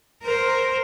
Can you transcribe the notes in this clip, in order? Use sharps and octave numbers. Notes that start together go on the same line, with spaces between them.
A#4 C5